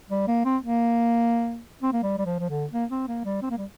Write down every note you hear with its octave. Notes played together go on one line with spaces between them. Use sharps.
G3
A#3
C4
A#3
C4
A#3
G3
G3
F3
F3
D3
A#3
C4
A#3
G3
C4
A#3
G3